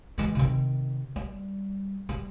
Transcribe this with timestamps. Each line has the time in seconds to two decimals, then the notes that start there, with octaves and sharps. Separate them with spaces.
0.18 E3 G#3
0.35 C3 D#3
1.16 G3
2.09 G3